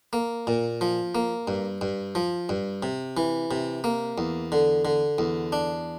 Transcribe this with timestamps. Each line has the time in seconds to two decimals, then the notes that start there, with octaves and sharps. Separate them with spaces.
0.13 A#3
0.47 A#2
0.81 F3
1.15 A#3
1.48 G2
1.81 G2
2.15 F3
2.49 G2
2.83 C3
3.17 E3
3.51 C3
3.84 A#3
4.18 E2
4.52 D3
4.85 D3
5.18 E2
5.52 D4